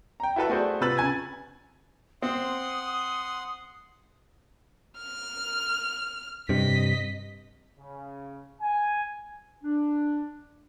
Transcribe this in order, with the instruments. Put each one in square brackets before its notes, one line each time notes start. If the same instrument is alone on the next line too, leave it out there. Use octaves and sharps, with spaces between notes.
[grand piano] G5 A#5
E4 F#4 A4 B4 E5
A3 F#4 G#4 A4 C5 D5
C3 F4 B4 E6 A6 F#7
C#3 G#5 G#6 A6
[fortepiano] C4 [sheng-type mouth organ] F#5 C6 [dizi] D#6
[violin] F6
[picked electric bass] G2 C3 [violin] D#5 B6
[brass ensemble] C#3
G#5
[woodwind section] D4